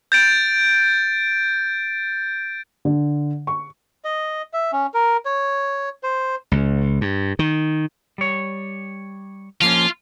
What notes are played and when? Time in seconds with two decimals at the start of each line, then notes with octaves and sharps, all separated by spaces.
0.12 G6 A6 D7
2.85 D3
3.47 C#6
4.05 D#5
4.53 E5
4.72 C#4
4.94 A#4
5.25 C#5
6.03 C5
6.52 C#2
7.01 G2
7.39 D#3
8.18 G3 C#5
9.61 F3 A#3 C#4 F4